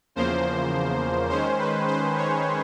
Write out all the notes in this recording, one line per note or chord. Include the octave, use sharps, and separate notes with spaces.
E2 C#3 F3 A#3 C5
D#3 G#3 C#4 C5
B4
C5
C#5